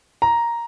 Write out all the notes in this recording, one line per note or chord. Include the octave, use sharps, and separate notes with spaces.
A#5